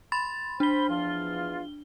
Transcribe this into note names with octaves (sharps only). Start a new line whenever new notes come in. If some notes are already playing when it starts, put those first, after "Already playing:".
B5 C6 A6
D4 C5 B5 G7
E2 F3 F4